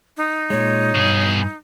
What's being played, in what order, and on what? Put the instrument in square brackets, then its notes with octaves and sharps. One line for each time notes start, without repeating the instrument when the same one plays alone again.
[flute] D#4
[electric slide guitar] A#2 G#3 [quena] C#5
[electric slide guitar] G2 [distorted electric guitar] B2 G#4